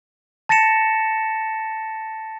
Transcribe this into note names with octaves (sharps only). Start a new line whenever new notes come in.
A5 A6 A#6 C#7 E7